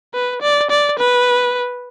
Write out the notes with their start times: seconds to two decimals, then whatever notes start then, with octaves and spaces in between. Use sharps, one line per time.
0.14 B4
0.42 D5
0.70 D5
0.99 B4